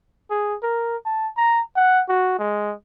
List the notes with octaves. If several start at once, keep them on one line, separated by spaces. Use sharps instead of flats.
G#4
A#4
A5
A#5
F#5
F#4
G#3